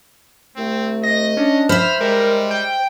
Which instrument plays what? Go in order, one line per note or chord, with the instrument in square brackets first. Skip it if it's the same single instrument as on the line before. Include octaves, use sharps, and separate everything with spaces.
[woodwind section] C2 A3 [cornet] C4
[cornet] D#5 [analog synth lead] A#6
[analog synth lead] C#4 [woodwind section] D4
[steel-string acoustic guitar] C5 E5 [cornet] B5 [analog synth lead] F6
[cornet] G3 [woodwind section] G#3 [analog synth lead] A#4
[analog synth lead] G5